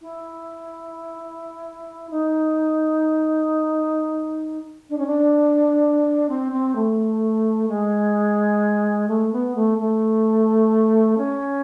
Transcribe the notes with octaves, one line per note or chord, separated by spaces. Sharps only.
E4
D#4
D4
C#4
D4
C4
C4
A3
G#3
A3
B3
A3
A3
C#4